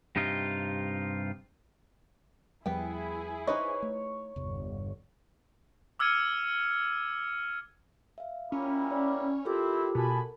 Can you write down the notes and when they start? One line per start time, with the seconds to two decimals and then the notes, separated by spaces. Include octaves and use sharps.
0.16 G2 C3 D#4 F4
2.66 E2 F3 G3 B3 E4 G#4 G5
3.47 D#4 B4 C#5 D#5
3.82 A3
4.36 G1 E2 C3
5.99 D6 E6 F6 G#6 C#7 D#7
8.18 E5 F5
8.52 G3 A#3 C#4 E4 F4
8.91 C#5 D5
9.45 C4 E4 F4 G4 A4 A#4 D6
9.95 B2 G#5 A5 B5